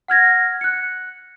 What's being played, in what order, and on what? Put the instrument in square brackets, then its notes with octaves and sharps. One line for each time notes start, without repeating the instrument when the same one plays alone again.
[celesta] F#5 F6 G#6 A#6
F#6 C#7